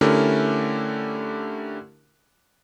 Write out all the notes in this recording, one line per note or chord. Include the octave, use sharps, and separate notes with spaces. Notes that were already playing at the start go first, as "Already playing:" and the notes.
D3 A3 C#4 E4 G4 A#4